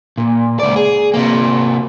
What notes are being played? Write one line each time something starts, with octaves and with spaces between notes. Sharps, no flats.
A#2
C#2 D5
G#4
C3 A#3